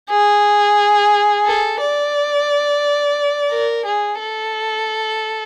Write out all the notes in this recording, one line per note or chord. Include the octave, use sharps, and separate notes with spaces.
G#4
A4
D5
A#4
G#4
A4